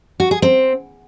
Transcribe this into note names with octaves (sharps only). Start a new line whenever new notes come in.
F#4
G#4
C4